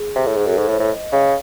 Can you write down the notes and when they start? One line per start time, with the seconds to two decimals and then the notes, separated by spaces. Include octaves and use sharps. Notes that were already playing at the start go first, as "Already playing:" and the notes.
Already playing: G#4
0.16 C3
0.26 A2
0.37 G#2 G#4
0.47 F#2 A4
0.58 G#2
0.69 A2 C5
0.80 A2
0.90 D#5
1.12 C#3